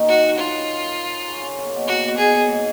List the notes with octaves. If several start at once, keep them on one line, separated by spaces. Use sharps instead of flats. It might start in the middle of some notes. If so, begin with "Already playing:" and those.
Already playing: F#2 A#2 D#3 F#3 A#3 C#4 D#4
F#4
F4
C#3 C#4
C#3 C#4
C#3 C#4
A#3
B2 B3
A#2 A#3 F#4
B2 B3
B2 B3 G#4
A#2 A#3
G#2 G#3